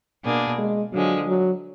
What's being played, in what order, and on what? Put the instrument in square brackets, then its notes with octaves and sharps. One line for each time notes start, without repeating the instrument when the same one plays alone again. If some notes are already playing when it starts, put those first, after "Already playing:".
[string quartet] B2 A#3 D4 G#4
[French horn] G#3
[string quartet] D3 F3 G#3 [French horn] F#3
[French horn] F#3